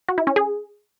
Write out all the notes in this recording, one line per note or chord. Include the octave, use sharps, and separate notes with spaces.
F#4
E4
C#4
G#4